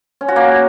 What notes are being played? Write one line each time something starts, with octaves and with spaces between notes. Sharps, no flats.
C#4
F#4
A#3